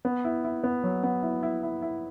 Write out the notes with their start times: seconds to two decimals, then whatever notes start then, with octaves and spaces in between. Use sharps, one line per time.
0.05 B3
0.24 E4
0.44 E4
0.64 B3
0.84 F#3
1.03 B3
1.23 E4
1.43 E4
1.63 E4
1.82 E4